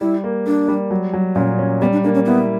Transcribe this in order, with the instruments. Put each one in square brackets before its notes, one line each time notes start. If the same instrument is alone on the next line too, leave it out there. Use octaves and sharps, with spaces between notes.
[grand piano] G3 [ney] E4
[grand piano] A#3
[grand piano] A#3 [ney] D4
[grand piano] G3
F#3
F#3
[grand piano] A#2 [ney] C#4
[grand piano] C#4
[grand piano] G3 [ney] B3
[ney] D4
[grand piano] A#3 [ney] D4
[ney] C#4
[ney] B3 [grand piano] E4